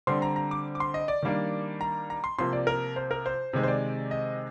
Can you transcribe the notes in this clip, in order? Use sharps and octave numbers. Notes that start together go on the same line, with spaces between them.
D3 G3 C4 C6
A#5
A#5
D6
D6
C6
D#5
D5
D#3 G3 A#3 D4
A#5
A#5
C6
C3 F3 A#3 C6
D5
A#4
C5
A#4
C5
C3 D#3 G#3 C4
C5
D5
D#5